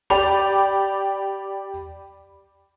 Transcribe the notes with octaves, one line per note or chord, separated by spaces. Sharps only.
G4 D5 G5 B5 D6 F7